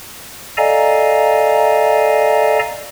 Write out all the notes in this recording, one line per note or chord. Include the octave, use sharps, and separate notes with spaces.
A4 D5 D#5 F5 G#5 A#5